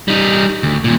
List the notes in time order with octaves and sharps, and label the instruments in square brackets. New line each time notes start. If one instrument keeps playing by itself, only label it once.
[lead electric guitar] G3 D#4
D2
D#2 A#2